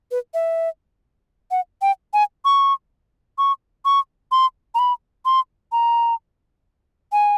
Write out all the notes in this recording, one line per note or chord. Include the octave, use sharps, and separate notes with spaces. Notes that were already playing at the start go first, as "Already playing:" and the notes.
B4
E5
F#5
G5
G#5
C#6
C#6
C#6
C6
A#5
B5
C6
A#5
G#5